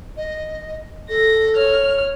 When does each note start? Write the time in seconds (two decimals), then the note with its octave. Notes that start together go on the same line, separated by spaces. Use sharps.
0.17 D#5
1.09 A4 A#6
1.55 C#5 F6